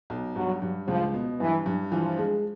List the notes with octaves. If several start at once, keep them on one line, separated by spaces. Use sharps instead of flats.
B1
G2 F#3
G2
C#2 F3
B2
G2 E3
G2
E3 F3
G#3